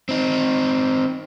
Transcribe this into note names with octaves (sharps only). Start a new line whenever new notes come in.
C4 D#4